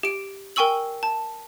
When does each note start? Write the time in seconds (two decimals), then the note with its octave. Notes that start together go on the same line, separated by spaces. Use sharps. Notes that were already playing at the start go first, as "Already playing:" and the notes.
0.03 G4 D7
0.56 A#4 G5 G#5 C#6 E6 F#7
1.03 A5